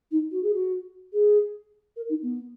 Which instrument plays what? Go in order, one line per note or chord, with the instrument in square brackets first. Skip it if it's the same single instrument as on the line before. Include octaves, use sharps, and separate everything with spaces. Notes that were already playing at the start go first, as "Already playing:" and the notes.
[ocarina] D#4
F#4
G#4
F#4
G#4
A#4
D#4
B3